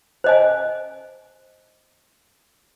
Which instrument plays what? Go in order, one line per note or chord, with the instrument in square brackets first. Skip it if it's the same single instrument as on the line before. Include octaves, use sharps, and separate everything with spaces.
[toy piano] C5 D#5 G#5